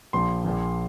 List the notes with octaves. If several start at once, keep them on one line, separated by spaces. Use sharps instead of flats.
A#1 A#2 F3 C6
A#1 A#2 F3